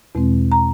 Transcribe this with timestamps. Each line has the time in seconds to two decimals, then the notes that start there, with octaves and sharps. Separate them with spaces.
0.15 E2 B2 G#3 C4
0.52 A#5